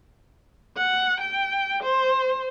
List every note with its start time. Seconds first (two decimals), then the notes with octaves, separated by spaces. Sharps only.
0.77 F#5
1.21 G5
1.83 C5